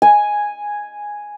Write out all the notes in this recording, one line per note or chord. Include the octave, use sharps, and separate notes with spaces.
G#5